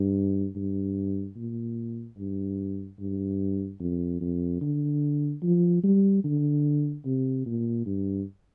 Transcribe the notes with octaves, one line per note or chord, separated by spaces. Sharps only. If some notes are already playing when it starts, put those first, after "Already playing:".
Already playing: G2
G2
A#2
G2
G2
F2
F2
D3
F3
G3
D3
C3
A#2
G2